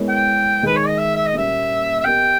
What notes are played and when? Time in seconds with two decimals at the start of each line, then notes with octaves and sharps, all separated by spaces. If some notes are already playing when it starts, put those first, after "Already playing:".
Already playing: G#3 B3 E4 A#4 C#5
0.09 G5
0.63 D#3 G#3 D#4 G#4 B4
0.76 C#5
0.87 D#5
0.98 E5
1.15 E5
1.26 D#5
1.33 A#2 G3 A#3 C#4 E5
2.01 E5
2.04 B3 G4 A#4 D#5 G5